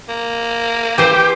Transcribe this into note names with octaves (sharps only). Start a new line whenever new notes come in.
A#3
E3 G4 C5